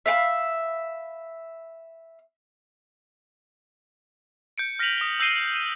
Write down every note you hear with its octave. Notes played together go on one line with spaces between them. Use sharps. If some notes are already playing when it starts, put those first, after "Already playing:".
E5 F5 G5 B5
G6 C#7 D7
F6 A#6 B6 D#7 F7 F#7
D#6 A#6 G7
E6 G6 A#6 C7 D#7 G7
D#7